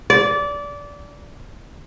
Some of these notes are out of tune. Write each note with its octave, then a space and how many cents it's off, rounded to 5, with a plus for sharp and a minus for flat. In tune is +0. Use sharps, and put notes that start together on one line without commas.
D5 -20